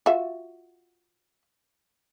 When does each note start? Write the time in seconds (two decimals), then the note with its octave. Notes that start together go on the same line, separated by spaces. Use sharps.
0.06 F4 F#4 E5